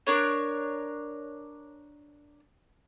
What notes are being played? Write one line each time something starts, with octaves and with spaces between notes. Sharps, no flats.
D4 A#4 C#5